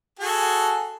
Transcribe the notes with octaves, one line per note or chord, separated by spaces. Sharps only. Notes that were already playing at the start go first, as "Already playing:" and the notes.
F#4 G#4 A4